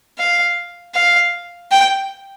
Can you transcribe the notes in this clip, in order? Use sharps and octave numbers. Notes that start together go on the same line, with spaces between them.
F5
F5
G5